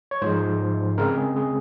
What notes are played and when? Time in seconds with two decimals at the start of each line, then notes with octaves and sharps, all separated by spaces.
0.11 C#5
0.22 G#2 F3 G#3 C5
0.98 C#3 G#3 C4 A#4
1.17 G#4
1.36 G#4